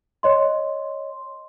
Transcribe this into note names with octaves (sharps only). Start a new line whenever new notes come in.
C#5 D#5 C6